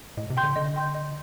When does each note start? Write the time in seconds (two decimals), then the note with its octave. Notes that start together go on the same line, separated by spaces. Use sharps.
0.17 A2 D#5
0.30 C3
0.37 G5 C6 G6
0.43 D3
0.56 D3 D#5
0.76 G5 C6 G6
0.95 D#5